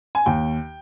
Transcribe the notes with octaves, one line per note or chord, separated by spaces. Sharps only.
G#5
D#2 G5